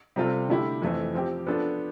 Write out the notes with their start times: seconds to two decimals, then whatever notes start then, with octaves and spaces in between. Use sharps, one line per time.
0.16 C3 G3 C4 F4 A4
0.49 D3 A3 E4 G4
0.82 F2 E3 A3 C4
1.14 F3 C4 G4
1.46 F3 B3 D4 A4